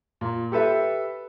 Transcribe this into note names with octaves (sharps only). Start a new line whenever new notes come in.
A#2
G4 A4 B4 E5